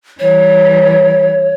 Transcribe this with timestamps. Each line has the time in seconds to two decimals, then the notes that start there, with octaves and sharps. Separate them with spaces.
0.19 E3 G3 C#5